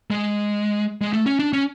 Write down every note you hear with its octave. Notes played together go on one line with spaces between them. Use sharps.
G#3
G#3
A3
C#4
D4
C#4